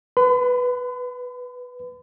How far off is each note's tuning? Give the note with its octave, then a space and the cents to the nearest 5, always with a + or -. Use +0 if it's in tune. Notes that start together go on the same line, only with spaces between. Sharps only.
B4 +0 B5 +45